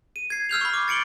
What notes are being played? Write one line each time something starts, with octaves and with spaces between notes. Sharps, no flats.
D#7
G#6 C7
E6 F6 G6 F7
B5 C#6
D6
A6 C#7 D7 F#7 G7